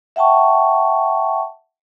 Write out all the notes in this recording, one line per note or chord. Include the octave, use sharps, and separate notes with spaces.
E5 F#5 G5 A5 C#6